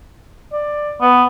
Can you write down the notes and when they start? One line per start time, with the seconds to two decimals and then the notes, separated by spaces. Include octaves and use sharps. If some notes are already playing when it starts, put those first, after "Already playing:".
0.52 D5
1.01 B3